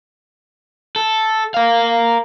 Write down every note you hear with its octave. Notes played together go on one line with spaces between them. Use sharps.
A4
A#4 F5